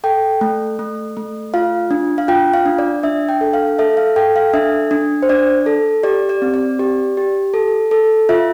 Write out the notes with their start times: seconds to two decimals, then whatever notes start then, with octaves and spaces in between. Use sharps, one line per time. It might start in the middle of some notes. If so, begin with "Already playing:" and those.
0.04 A4 G5
0.41 A3
0.79 A3
1.17 A3
1.54 F4 F5
1.91 D4
2.18 F5
2.28 F4 G5
2.53 F5
2.66 D4
2.79 D5
3.03 D4 E5
3.29 G5
3.41 A4
3.53 F5
3.79 A4 E5
3.97 F5
4.16 A4 G5
4.36 F5
4.54 D4 E5
4.91 D4
5.22 C5
5.29 D4 D5
5.66 A4
6.03 G4 D5
6.29 D5
6.42 C4
6.54 D5
6.79 G4 D5
7.17 G4
7.54 A4
7.91 A4
8.29 F4 E5